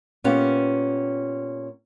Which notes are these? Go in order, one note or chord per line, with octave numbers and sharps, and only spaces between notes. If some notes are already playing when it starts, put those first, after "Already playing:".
A#2 B3 C#4 G4 F5